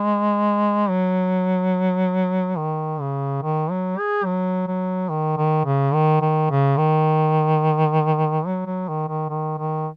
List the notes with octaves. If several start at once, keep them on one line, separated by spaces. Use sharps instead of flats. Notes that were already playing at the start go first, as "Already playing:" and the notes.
Already playing: G#3
F#3
D#3
C#3
D#3
F#3
G#4
F#3
F#3
D#3
D#3
C#3
D#3
D#3
C#3
D#3
F#3
F#3
D#3
D#3
D#3
D#3